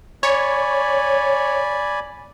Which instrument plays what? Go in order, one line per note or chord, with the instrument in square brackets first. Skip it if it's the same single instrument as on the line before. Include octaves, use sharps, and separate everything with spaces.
[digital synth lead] C#5 [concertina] D5 G#5 B5